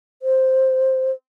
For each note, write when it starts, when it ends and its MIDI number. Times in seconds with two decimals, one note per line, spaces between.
0.22 1.11 72